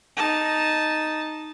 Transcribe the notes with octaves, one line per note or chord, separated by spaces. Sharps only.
D#4 A5